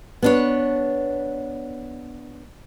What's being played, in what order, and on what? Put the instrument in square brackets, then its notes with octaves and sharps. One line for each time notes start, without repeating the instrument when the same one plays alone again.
[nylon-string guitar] B3 D4 C#5